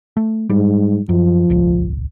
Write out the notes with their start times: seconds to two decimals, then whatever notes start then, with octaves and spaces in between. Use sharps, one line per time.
0.17 A3
0.50 G#2 G3
1.09 F#2 F3
1.50 D#1 G#1 C#2